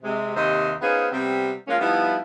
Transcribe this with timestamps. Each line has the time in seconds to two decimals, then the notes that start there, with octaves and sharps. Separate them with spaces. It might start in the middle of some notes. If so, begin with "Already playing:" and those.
0.03 C3 G#3
0.36 D#2 C3 C5 D#5
0.81 B3 C#4 D#4 F4 G#4 C5
1.11 C3 G3 B3 C4
1.67 F3 G#3 A#3 C#4 F4
1.80 F3 G3 B3 D#4 E4